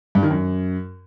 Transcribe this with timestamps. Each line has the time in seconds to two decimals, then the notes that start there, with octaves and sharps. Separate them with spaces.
0.15 G2
0.23 D#3
0.31 F#2